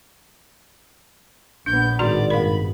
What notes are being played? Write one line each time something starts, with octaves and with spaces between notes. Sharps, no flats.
A#1 B3 D4 G6
G#1 A2 F#4 D5 C6
G2 B3 A#4 F5 B5